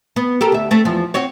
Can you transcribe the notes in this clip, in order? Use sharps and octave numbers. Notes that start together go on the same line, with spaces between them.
B3
G4 A4 A#4
D2 E5
A3 C4
E2 F3
C4 F#4 C#5